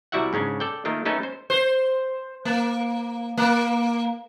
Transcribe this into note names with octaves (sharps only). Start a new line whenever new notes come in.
C2 G3 E4 F#4 E5 F#5
G#2 C#3 C#4 D4
A4 D5 G5
D#3 A3 A#3 F4 A#4
A3 C#4 D#4 A4 B4
C5
C5
A#3
A#3